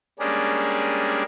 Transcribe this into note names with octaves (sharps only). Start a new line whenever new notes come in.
G3 G#3 A#3 C#4 D4 G#4